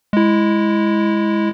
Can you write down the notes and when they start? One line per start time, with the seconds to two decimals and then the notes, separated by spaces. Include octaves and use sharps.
0.13 G#3 E4